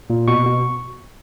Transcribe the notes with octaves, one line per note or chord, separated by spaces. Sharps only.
A#2
B2 C#6
B2